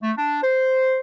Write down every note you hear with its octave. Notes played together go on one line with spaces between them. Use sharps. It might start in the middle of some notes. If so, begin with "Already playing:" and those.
A3
D4
C5